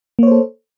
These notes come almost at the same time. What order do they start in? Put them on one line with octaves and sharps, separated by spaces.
A#3 C#5 C5 A4